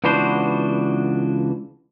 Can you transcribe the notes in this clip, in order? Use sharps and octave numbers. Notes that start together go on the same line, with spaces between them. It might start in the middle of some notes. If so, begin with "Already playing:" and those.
C#2 E3 B3 D4 F#4 C5